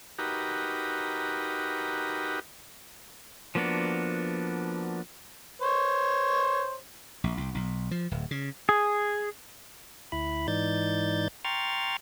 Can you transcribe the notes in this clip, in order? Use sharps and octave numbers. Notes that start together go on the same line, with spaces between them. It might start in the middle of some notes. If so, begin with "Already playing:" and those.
D#4 F#4 G4 A#4 B4
F3 A#3 B3 D4 F#4
C5 C#5
A#1
C2
B1
F3
D1
C#3
G#4
D2 E4 B5
G#2 E3 D#4 D5 G6 A6
G5 A#5 C6 C#6 F6 A6